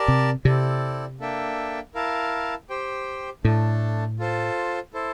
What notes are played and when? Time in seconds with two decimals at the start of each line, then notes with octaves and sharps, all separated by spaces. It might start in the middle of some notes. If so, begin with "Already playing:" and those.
Already playing: G4 A#4 D5 A5
0.08 C3
0.45 C3 C4 E4 A4 D5
1.20 A#3 D4 A4 E5 G5
1.95 E4 A#4 F5 A5
2.70 G4 C5 G5
3.45 A2 A3 D4 A4
4.19 F4 A4 C5
4.94 E4 A4 C5